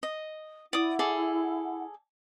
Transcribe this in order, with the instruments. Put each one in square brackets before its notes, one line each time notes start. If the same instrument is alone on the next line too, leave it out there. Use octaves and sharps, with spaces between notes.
[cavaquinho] D#5
[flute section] E4 F#5 [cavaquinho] D5 D#6
[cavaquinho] G#4 A4 D5